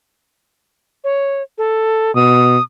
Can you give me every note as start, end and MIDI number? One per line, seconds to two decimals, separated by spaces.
1.04 1.42 73
1.58 2.14 69
2.15 2.57 47
2.15 2.62 87